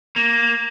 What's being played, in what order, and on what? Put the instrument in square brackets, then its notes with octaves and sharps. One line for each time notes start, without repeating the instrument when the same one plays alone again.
[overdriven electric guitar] A#3